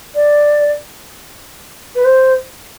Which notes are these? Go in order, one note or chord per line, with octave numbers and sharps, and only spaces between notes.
D5
B4
C5